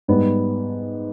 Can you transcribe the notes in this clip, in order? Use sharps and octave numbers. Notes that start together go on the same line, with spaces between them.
G#2 G3 B3